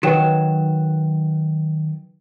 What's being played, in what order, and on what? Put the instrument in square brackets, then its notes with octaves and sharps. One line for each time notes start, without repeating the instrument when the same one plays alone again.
[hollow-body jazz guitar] D#3 F#3 [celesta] B4 G5 E7